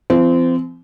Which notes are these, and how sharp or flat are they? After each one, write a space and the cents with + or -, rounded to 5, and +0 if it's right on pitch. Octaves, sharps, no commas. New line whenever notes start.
F3 -45 C4 -25